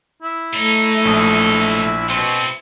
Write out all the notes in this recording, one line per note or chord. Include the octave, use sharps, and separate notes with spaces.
E4
B1 A3 D#4
A#1 D#6
B2 A3 C4 E4